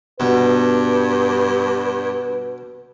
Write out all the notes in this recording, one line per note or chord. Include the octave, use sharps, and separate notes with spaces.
G2 B2 B4